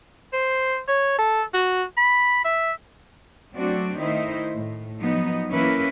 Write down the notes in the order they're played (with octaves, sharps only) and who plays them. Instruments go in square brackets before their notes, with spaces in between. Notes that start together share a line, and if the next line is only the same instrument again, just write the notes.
[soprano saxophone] C5
C#5
A4
F#4
B5
E5
[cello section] F#3 A3 C4 D4 F#4 D5
D#3 A3 D#4 E4 C5
A2
F3 F#3 B3 D#4
E3 A#3 C#4 E4 A#4 B4